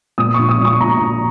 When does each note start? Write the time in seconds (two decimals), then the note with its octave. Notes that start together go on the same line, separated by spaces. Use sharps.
0.18 A#2 D#6
0.34 C#6
0.38 A#1
0.49 D#6
0.59 A#2
0.65 C#6
0.79 A#2 A#5
1.00 A#1